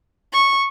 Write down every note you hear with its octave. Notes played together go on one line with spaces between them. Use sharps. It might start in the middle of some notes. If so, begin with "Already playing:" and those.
C#6